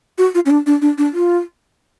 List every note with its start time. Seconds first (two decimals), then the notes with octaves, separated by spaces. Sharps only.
0.18 F#4
0.34 F4
0.46 C#4
0.50 D4
0.66 D4
0.82 D4
0.98 D4
1.13 F4